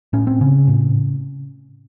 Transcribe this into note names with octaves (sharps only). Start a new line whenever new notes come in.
A2 C#4
C4
C#3 C#4
A2